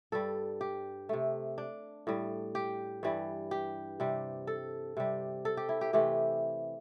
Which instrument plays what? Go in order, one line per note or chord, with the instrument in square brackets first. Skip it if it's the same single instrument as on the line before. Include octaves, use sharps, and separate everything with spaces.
[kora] G2 G3 A4
G4
C3 A3
D4
A2 G3
G4
G2 E3 G3
G4
C3 G3
A4
C3 G3
A4
G4
E4
G4
C3 E3 A3 G4